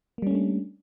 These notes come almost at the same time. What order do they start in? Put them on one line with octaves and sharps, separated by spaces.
A#3 G3 C#4 A3 D4